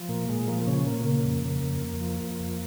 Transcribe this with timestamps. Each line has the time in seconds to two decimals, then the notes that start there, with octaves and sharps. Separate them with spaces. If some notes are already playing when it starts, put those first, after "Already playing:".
Already playing: F3
0.09 A#2 A#3
0.29 A#2 G#3
0.48 F3 A#3
0.62 A#3
0.67 A#2 C#3 C#4
0.86 A#2 A#3
1.05 C#3 A#3
1.25 F2
1.44 C#3
1.63 F2
1.82 F2
2.01 F3
2.20 F3
2.40 F2